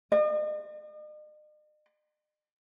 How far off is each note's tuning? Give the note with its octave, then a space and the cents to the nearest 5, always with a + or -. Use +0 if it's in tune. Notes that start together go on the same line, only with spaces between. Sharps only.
D#5 -45